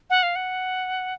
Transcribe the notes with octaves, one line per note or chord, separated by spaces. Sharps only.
F#5
F5
F#5